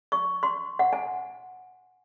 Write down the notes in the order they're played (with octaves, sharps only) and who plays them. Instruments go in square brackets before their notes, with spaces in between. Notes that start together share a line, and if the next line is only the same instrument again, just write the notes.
[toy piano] C#6
C6
F#5
G#5